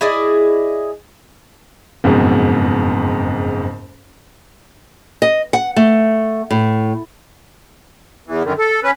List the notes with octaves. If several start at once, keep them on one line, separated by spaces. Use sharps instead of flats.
E4 G#4 D5 D#5
F#1 F2 G#2 B2
D#5
F#5
A3
A2
E2 E3
F#2 D3 D#3
A4
C#4 B4